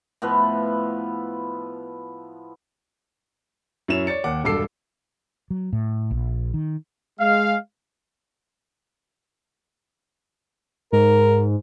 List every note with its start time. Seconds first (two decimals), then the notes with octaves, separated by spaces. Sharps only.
0.22 A2 F3 B3 B4
3.88 F#2 E4 C#5 E7 F7
4.07 C#5 D5 A6 C#7
4.24 D#2 F#5 D6
4.44 E1 G2 A4 D6 E6 C7
5.50 F#3
5.73 A2
6.11 A#1
6.54 D#3
7.20 G#3 F5
10.93 G#2 A#4